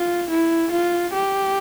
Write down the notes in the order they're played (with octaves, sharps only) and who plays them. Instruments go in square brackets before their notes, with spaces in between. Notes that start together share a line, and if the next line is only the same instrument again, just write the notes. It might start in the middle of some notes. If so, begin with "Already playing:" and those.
Already playing: [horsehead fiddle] F4
E4
F4
G4